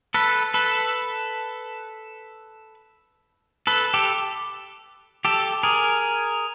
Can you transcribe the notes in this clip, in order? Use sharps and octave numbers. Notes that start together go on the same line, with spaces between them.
A4 B4
A4 B4
A4 B4
G4 A4
G4 A4
G#4 A#4